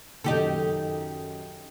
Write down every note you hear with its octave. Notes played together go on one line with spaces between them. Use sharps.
F#2 D#3 D#4 G4 A4